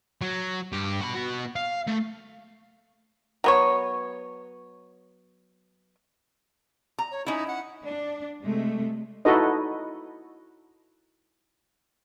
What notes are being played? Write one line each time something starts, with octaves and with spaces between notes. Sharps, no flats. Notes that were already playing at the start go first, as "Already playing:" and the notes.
F#3
G2 G4
F#4 B5
B3 F#4
F5
A3
F#3 B3 C#5
A#5
C#5
C#4 D#4 E4
F#5
D4
C3 G#3 A3
D#4 E4 F#4 A4 B4 D#5